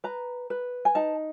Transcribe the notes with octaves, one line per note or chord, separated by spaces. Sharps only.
B4 A#5
B4
G#5
D#4 A5